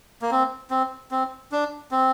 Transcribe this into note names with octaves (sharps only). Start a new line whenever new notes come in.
A#3
C4
C4
C4
D4
C4